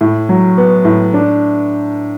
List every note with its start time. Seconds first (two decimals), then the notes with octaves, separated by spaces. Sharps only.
0.01 A2
0.29 F#3
0.58 B3
0.85 A2
1.14 D4